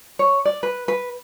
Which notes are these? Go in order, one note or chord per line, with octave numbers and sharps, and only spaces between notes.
C#5
D5
B4
B4